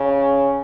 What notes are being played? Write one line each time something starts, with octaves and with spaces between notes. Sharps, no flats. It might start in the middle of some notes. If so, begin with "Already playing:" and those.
Already playing: C#3